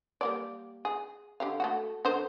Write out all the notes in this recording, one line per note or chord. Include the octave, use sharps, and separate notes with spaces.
G3 A#3 D5
G#4
D3 G4 F5
A3 A#3 F#4
D3 A#4 C5